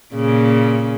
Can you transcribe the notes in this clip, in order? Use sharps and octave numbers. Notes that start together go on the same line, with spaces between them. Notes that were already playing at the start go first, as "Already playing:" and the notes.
A#2 C#3